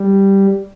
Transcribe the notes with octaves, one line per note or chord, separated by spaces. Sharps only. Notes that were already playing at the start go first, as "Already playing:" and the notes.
Already playing: G3